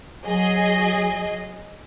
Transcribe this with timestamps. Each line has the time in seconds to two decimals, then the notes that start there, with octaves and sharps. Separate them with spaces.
0.24 F#3 G#4 D#5